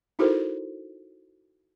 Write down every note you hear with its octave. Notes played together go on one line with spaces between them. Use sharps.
D#4 E4 F#4 A4 A#4 C5